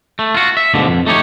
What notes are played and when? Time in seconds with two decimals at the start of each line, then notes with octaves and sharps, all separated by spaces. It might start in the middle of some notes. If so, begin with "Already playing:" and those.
0.19 A3
0.34 F4 F#4
0.57 E5
0.74 D2 G#2 B2 D3 F3
0.88 F2
1.07 A3 D#4 G4 C#5